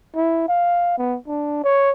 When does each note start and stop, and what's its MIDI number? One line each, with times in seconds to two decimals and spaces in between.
0.16 0.45 64
0.49 0.98 77
0.98 1.17 59
1.28 1.61 62
1.64 1.92 73